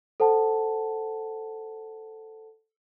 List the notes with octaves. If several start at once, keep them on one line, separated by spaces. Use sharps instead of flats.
A4 C5 F#5 A5